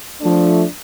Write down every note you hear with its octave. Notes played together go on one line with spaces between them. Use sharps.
F3 A3 D4